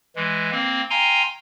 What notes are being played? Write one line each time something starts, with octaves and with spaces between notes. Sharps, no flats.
E3 G#3
A#3 C4
F5 G5 G#5 A#5 C6